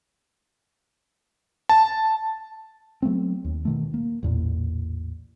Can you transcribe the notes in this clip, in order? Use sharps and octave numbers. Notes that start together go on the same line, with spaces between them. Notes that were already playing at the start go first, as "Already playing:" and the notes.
A5
F#3 A3 B3 C4
D#2
B2 D#3 A3
A#3
A1 E2 A#2